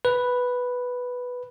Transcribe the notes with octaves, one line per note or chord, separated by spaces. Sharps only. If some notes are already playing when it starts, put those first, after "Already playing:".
B4